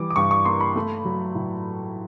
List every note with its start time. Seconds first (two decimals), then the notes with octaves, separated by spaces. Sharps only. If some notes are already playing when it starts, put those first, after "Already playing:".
Already playing: E3 G3 D6
0.10 D6
0.16 G2 C#6
0.31 C#6
0.45 A#3 C6
0.60 B5
0.76 A3
1.05 F#3
1.35 A2